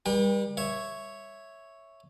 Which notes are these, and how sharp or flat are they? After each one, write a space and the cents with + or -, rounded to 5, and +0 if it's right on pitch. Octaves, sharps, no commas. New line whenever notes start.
G3 +25 B4 -45 G5 +35
C#5 +0 E5 +0